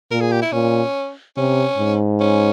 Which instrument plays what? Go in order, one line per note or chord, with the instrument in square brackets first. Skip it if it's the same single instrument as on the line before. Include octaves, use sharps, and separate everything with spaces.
[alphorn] A#2 [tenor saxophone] A#4
[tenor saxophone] G#4
G4
E4
[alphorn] A#2 [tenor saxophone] C#4
[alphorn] C3 [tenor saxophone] C#4
[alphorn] G#2
[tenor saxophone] C#4